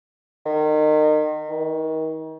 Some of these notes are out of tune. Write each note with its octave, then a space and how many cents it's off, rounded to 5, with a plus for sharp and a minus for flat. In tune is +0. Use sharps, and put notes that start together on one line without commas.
D#3 -30
D#3 +30